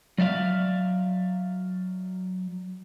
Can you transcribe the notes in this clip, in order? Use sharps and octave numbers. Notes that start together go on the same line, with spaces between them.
F#3 D5 E5 F5